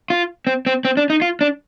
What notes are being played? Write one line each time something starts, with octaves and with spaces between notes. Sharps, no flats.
F4
C4
C4
C4
D4
D#4
F4
D4